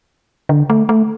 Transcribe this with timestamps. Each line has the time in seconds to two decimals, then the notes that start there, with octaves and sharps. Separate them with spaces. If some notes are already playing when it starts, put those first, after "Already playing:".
0.49 D3
0.70 A3
0.89 A3